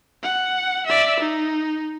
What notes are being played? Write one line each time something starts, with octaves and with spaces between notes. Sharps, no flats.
F#5
D5 E5
D#4